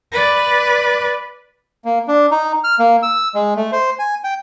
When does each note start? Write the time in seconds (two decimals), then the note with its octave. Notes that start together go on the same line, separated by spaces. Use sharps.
0.12 B4 D5
1.85 A#3
2.08 D4
2.31 D#4
2.64 F6
2.79 A#3
3.03 E6
3.35 G#3
3.56 A3
3.72 C5
3.99 G#5
4.24 G5